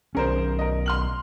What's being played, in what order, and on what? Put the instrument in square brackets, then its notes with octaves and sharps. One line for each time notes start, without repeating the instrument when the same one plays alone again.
[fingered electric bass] B1 C#4 [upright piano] G#4 A#4 C5
[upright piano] A#4 D#5
C6 F6 F#7